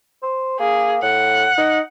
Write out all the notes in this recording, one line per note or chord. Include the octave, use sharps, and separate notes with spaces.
C5
A#3 G#4
A2 F#5
D#4